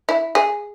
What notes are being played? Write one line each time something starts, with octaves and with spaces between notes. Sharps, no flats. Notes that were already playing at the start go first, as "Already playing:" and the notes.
E4
G#4